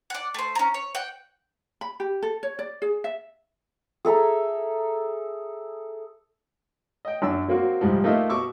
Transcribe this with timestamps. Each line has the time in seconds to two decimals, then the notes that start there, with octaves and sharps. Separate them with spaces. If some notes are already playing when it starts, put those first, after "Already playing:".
0.10 D5 F#5
0.34 A3 C5
0.55 C#4 A#5
0.74 C#5
0.95 F#5 G5
1.81 B5
2.00 G4
2.23 A4
2.43 C#5
2.59 D5
2.82 G#4
3.04 E5
4.05 G#4 A4 E5 A#5
7.05 D#5 G5
7.22 F#2 D4 E6
7.48 F#3 A#3 C4 F#4
7.81 C2 G#2 F3 G3
8.04 A3 A#3 D#4 F4 D#5 E5
8.29 B2 C#6 D6 E6